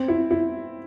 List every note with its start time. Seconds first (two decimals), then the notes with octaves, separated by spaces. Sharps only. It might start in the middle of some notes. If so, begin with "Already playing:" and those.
Already playing: C4
0.08 E4
0.31 E4